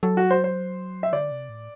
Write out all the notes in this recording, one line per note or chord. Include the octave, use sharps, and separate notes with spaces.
F#3 A4
F#4
C5
C5
E5
D3 D5
C3
A2